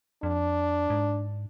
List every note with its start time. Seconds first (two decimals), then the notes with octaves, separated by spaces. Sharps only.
0.23 F2 D4
0.90 G#2